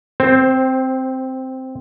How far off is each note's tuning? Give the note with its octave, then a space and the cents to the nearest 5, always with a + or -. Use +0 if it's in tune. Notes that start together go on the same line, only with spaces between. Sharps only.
C4 -5 C5 +20